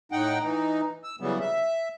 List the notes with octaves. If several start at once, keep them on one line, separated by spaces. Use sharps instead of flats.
A2 D#4 F#5 G5
E3 D#4
E6
C#3 E3 F#3 G3 B3
E5